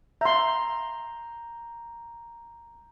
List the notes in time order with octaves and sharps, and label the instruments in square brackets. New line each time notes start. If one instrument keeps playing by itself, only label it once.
[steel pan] E5 C6 [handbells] A#5 G6